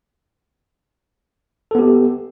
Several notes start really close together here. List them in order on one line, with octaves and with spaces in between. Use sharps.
A4 B3 G4